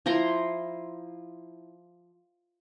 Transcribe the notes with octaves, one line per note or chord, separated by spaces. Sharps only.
F3 E4 A#5 C6